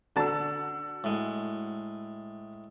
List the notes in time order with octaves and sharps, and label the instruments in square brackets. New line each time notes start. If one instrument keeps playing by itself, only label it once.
[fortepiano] D3 D4 A5 [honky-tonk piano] F#4 E6
[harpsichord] A2 G#3